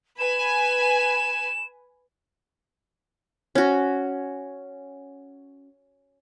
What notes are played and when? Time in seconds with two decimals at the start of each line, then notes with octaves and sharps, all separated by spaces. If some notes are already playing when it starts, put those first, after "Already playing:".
0.18 B4 G#5 E7
3.55 C#4 F#4